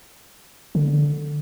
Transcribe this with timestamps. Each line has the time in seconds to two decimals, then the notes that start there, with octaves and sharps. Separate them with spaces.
0.75 D3